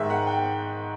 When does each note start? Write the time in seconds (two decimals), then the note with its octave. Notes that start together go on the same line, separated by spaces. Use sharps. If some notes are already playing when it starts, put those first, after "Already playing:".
Already playing: G#2 D#3 G#3 E5
0.10 F#5
0.27 G5